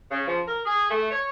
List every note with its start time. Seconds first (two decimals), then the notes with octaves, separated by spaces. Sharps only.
0.10 C#3
0.25 F3
0.46 A#4
0.64 G#4
0.88 A3
1.10 C#5